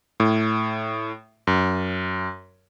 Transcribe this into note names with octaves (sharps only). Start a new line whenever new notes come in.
A2
F#2